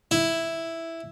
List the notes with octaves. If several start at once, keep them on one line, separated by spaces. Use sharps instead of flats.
E4